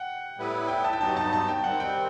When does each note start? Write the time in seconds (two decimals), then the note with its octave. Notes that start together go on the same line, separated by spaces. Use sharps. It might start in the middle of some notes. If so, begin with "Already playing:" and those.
Already playing: F#5 G5
0.37 A2 G3 B3 E4 B4
0.68 G5
0.84 A5
0.93 G5
1.00 G2 F#3 B3 D#4 A5
1.17 A5
1.33 A5
1.48 G5
1.64 D#3 G3 C4 F#5
1.80 G5